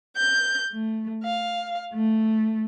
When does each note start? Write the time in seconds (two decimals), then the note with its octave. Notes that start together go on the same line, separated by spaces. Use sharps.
0.16 G6
0.71 A3
1.24 F5
1.93 A3